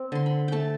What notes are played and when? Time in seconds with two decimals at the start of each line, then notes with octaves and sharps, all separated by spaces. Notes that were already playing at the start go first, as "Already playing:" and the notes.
Already playing: C4
0.12 D3 C6
0.26 B5
0.48 A3 G5 A5